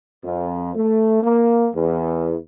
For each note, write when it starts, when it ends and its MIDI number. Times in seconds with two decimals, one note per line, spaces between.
0.25 0.72 41
0.76 1.23 57
1.23 1.68 58
1.75 2.36 40